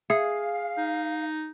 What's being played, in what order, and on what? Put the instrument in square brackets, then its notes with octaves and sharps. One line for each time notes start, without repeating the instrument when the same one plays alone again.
[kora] G#4 [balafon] E5 [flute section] F5
[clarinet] D#4